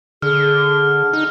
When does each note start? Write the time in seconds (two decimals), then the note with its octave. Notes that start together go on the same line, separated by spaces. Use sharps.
0.22 D3 G#4 F6
1.13 D#4